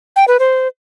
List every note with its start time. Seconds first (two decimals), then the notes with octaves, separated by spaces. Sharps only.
0.16 G5
0.28 B4
0.39 C5